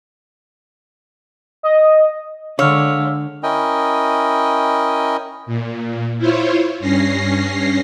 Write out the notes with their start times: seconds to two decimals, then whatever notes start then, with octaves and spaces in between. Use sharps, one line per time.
1.63 D#5
2.59 D3 G#3 C#5 F5 E6 F6
3.43 C#4 E4 A#4 D#5 G5
5.46 A#2
6.18 E4 F4 C5 C#5
6.80 G2 C#4 A#6 C7